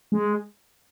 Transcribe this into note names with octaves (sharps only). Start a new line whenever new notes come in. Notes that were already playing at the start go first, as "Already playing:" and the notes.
G#3